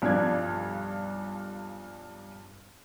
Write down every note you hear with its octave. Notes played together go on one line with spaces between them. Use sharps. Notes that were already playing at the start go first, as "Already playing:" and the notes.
B1 G2 F3 D4 G#6